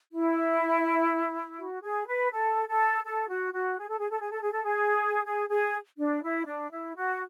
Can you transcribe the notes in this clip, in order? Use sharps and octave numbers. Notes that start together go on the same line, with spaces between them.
E4
F#4
G#4
B4
A4
A4
A4
F#4
F#4
G#4
A4
G#4
A4
G#4
A4
G#4
A4
G#4
G#4
G#4
D4
E4
D4
E4
F#4